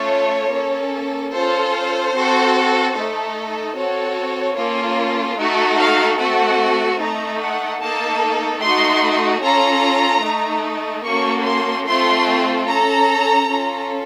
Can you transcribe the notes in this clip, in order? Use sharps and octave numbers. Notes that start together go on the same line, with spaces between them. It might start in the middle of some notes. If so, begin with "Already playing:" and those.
Already playing: A3 C#4 F4 A4 C#5
A#3 C#4 A4
C#4 F4 A4 C5
C4 F#4 A4
A3 D#4 A4
C4 F#4 A4 C#5
A#3 C#4 F4 A4
A3 D#4 F#4 A4
F5
A3 C4 F#4 A4 F#5
A3 D#4 A4 A#5
F#5
A#3 D#4 A4 A5
A3 D#4 F#4 C6
C#4 F4 A4 A#5
A3 D#4 A4
A#3 C#4 F#4 A4 C#6
C6
A3 C4 F4 A4 C6
C#4 A4 A#5
C#4 F4 A4